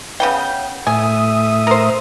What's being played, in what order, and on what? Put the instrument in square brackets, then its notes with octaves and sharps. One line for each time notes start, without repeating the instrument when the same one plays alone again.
[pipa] C#3 B3 G5
[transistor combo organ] A2 E5 D#6 [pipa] G#5
[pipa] A#4 C5